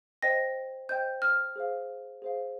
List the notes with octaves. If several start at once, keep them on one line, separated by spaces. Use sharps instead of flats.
C5 D#5 G5 A#6
C5 D#5 G5 G6
F6
G#4 C5 F5
G#4 C5 F5